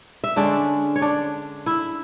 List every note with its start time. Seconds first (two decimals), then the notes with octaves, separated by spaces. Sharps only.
0.24 E5
0.36 D3 G#3 C#4 D4 D5
0.96 C#5
1.02 D4 D5
1.66 E4 E5